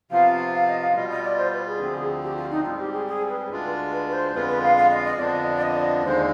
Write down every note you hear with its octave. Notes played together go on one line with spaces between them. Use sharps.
C3 F3 B3 F4 F5
F5
D#5
F5
B2 G3 B3 F4 D#5
D#5
D5
C5
B4
G#4
D2 D3 F3 C4
G4
F4
D#4
G#2 G3 C4 F4
G4
G#4
G#4
B4
D2 D3 G#3 D4 F4
B4
B4
C5
F2 D3 G#3 B3 F4 B4
B4
F5
F5
D#5
D#5
F2 D3 F3 B3 D4 D5
D#5
D5
D#5
D#2 D3 G#3 C5